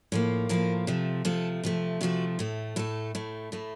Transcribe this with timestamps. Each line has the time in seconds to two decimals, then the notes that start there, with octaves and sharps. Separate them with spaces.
0.12 A2 F3 A#3
0.49 A2 F3 A#3 A#4
0.87 C3 F3 A3
1.25 C3 F3 A3 A4
1.63 C3 F3 A3
2.01 C3 F3 A3 F#4
2.39 A2 A3
2.76 A2 A3 A4
3.15 A2 A3
3.52 A2 A3